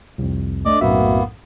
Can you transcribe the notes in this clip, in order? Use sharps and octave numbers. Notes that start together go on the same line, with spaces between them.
C2 F2
A3 D4 D5 D#5 D6
B1 F#2 A2 A#3 B3 F#4 E5